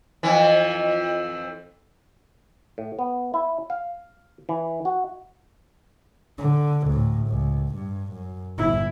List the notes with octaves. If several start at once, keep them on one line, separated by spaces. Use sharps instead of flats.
F2 E3
A2
B3
E4
F5
E3
F#4
D3
D2 A2
C#2
G2
F#2
G1 E4